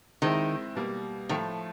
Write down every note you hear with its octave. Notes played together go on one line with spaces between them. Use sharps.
D#3 G#3 C4 E4
B2 G3 A#3
A2 D#3 F3 A3